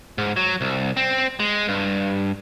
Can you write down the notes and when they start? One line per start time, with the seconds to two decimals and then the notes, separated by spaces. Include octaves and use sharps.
0.18 G#2
0.36 F#3
0.61 C2
0.97 C4
1.40 G#3
1.68 G2